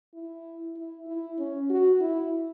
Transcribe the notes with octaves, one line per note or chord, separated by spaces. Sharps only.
E4
E4
E4
C#4
F#4
E4